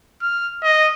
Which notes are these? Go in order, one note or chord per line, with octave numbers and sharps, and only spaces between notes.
F6
D#5